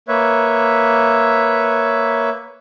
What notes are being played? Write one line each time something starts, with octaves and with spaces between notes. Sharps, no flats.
A#3 B4 C#5 E5